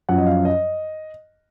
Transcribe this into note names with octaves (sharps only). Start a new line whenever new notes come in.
F#2 F3 F#5
D#5
F5
D#5